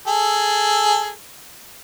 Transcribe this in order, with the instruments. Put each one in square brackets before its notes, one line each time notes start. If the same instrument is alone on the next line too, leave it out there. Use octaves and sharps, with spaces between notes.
[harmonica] G#4 A4